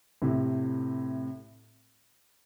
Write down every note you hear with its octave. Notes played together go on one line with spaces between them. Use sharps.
A2 C3